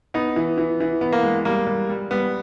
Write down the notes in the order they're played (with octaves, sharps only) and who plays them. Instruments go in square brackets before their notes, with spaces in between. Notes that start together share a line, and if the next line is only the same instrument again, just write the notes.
[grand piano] B3 [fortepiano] D#4
[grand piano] E3
E3
E3
B3
[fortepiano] A#3
[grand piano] G#3
[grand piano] G3 [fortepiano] A#3
[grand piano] G3
G3
[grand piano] G3 [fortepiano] B3